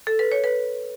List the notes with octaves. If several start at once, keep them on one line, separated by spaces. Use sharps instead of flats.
A4
B4
C#5
B4